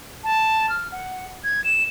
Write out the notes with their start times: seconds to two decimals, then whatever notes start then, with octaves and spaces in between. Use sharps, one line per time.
0.24 A5
0.69 F6
0.92 F#5
1.44 G#6
1.65 E7